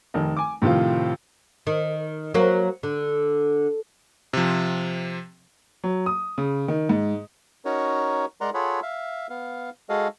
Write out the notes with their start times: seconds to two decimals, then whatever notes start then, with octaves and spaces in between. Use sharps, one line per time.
0.14 F1 D#3 D#4
0.37 G#5 D6
0.62 A2 C3 D#3 F3 F4
1.67 D#3
2.34 F#3 A#3
2.83 D3
4.33 C3 F3
5.84 F#3
6.06 D#6
6.38 C#3
6.68 D#3
6.89 G#2
7.65 C#4 D#4 F#4 A#4 C#5
8.41 G#3 A#4 D5 F#5 A#5 C6
8.54 F4 G#4 A4 C#5 F#5 B5
8.82 E5 F5
9.30 B3 F5
9.89 G#3 F#4 G#4 A4 D#5 F5